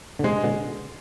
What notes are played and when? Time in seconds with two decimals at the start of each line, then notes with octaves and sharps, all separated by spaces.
0.19 D3
0.24 C3 G#3
0.44 B2 D3